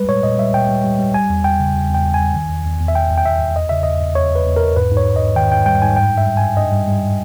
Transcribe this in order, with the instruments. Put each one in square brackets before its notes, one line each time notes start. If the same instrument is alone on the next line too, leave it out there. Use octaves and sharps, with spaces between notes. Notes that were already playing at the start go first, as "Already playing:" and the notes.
Already playing: [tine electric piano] G3 G#3 B4
A#2 C#5
A#2 D#5
G3 E5
A#2 G5
G3
G3
G3
G3 G#5
E2
E2 G5
C#3
E2
E2 G5
E2
G#5
G3
D#3
E2
E2
E2
E5
E2 G5
E2
G5
E2 E5
E2
E2 D#5
C#3 E5
E2 D#5
E2
E2 C#5
E2 B4
E2
A#4
E2
G#2 B4
G#2
C#5
G#2
D#5
G#2
D#3 G5
G#2 G5
G3 G5
G#2 G#5
G2 G5
G2
E5
G3
G#5
G2
G2 D#5
G3
G3